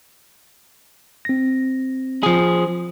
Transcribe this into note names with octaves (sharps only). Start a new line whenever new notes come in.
C4 A#6
F3 G#4